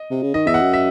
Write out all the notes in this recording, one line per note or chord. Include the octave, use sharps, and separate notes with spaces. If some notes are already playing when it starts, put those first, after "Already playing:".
Already playing: D#5
C3
C#3
D#3 D#5
E2 E5
F#5
F#2
E5